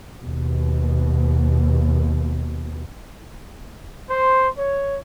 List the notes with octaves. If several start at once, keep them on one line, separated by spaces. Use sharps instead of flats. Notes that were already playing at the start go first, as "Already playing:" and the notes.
D#2 B2
C5
C#5